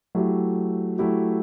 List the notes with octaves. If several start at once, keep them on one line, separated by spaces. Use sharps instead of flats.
F#3 A3 E4 G4
F#3 A3 E4 G4